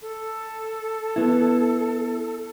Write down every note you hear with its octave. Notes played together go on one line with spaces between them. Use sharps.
A4
B3 E4